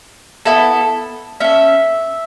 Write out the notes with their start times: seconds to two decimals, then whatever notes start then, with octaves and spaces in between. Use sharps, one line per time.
0.45 B3 E4 A4 A5
1.40 C#4 A4 E5